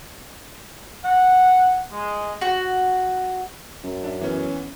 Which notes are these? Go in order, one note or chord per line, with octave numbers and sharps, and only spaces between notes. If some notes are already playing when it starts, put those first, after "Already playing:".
F#5
G#3
F#4
F#2
D4 E5
E3 B3 C#4